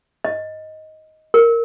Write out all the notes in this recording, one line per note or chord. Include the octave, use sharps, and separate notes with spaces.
D#5
A#4